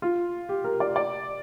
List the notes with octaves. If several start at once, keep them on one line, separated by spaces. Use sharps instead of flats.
F4
G4
A#4
D5
D5